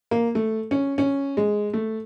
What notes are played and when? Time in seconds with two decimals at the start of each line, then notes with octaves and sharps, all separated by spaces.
0.11 A#3
0.35 A3
0.71 C#4
0.98 C#4
1.37 G#3
1.74 A3